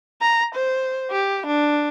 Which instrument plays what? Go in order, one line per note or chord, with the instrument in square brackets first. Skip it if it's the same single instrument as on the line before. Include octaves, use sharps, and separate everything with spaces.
[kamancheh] A#5
C5
G4
D4